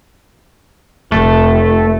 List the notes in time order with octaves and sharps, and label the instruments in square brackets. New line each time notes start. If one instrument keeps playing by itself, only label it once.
[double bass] F1 [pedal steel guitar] A3